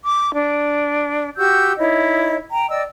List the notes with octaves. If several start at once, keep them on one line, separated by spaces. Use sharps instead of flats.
D6
D4
F#4 G4 E6 G6
D#4 E4 C#5 D#5
G5 A#5
D5 D#5 G5 E6